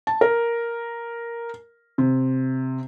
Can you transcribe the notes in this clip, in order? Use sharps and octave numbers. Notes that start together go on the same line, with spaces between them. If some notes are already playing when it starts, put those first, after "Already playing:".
A5
A#4
C3